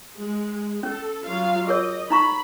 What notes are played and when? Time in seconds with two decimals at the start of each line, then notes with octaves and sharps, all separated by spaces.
0.15 G#3
0.83 C#4 A4
1.24 F#3 F4 F5
1.68 G#4 A#4 C#5 D#5
2.10 D#4 A#5 B5 C#6